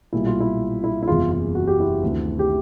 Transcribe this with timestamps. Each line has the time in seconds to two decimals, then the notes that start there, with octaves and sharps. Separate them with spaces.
0.13 B1 A#2 G3 A#3 E4
0.27 F4
0.40 E4
0.84 E4
1.02 E4
1.08 F#1 E2 C3 E3 G#3 F4
1.31 F4
1.55 F#4
1.67 G4
1.80 E4 F#4
2.02 D2 C3 D#3
2.39 G4